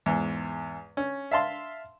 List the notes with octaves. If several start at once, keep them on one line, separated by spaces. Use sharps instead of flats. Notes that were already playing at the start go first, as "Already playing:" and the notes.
E2 G#2
C#4
E5 F5 A5 C6